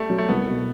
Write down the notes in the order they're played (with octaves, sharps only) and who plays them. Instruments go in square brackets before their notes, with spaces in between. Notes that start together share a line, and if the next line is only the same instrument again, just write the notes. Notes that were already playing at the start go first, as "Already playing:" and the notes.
Already playing: [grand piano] G3 A3
[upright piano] F#3
[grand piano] A3
[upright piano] C2 [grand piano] B3
[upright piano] B2